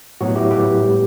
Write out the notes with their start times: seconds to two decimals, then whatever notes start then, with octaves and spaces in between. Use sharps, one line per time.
0.21 A2 F#3 B3 F#4
0.36 E4 G4
0.51 G4 B4
0.81 A2 G3 B3